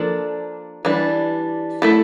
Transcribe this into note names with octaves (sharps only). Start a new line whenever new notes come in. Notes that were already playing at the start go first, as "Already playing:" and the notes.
Already playing: F3 A#3 D4 A4 D5
E3 G3 D4
A3 E4 A4